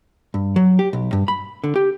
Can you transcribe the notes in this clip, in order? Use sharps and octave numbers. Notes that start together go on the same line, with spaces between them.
G2
F#3
G4
B1
G2
B5
D3
G4